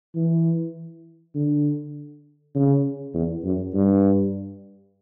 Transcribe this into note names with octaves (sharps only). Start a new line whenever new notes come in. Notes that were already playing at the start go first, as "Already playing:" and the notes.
E3
D3
C#3
E2
F#2
G2